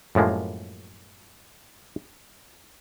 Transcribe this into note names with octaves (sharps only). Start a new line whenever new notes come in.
F#2 A2 F3 G#3 A#3